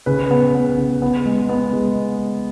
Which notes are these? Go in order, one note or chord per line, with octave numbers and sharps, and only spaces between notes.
C#3 B4
B3
B3
C#3
B3
G#3
B3
G#3